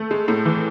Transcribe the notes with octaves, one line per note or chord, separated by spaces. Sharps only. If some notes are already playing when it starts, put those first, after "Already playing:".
Already playing: A3
G#3
A2
E3